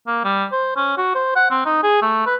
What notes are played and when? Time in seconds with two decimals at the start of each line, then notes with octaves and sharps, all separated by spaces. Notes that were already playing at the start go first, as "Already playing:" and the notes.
0.07 A#3
0.24 G3
0.52 C5
0.76 C#4
0.97 F#4
1.15 C5
1.36 F#5
1.51 C4
1.65 D#4
1.83 G#4
2.02 A3
2.26 B4